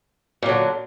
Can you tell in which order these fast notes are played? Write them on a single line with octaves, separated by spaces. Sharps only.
A#2 F#3 D3